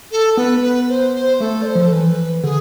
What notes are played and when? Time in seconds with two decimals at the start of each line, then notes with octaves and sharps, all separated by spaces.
0.12 A4
0.37 B3 B4
0.63 B4
0.89 C5
1.15 C5
1.40 A3 A4
1.62 D5
1.66 C5
1.75 F3
1.82 A4
1.92 E3 B4
2.43 D3 G#4